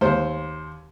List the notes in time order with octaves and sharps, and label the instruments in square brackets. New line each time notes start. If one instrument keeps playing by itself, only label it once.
[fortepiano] D#2 C5